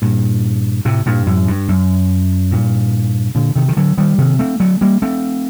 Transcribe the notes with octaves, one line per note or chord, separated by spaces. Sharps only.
G2 A#2
A2 C3
G2 A#2
F#2 A2
G2
F#2
G2 A#2
A#2 D3
C3 D#3
D#3
D3 F#3
D#3 G3
C3 D#3
A3 C4
F#3 A3
G3 A#3
A3 C4